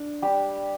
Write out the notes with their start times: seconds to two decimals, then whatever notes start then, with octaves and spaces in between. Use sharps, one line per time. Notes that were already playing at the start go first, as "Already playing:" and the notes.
Already playing: D4
0.22 G3 D4 G4